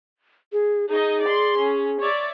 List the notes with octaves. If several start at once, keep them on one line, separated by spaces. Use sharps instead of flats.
G#4
D#4 G#4 D#5
D5 C6
C#4
C#5 D5 E5